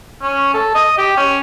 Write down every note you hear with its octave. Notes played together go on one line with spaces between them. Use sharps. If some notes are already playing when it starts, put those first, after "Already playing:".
C#4
A4
D#5
G4
C#4